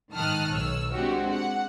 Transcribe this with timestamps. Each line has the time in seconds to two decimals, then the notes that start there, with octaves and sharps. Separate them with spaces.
0.13 G#2 D#3 A5 D#6 F6 F#6
0.51 B1 C#5 E6
0.92 G#3 C4 D4 F#4 G4
1.31 F#5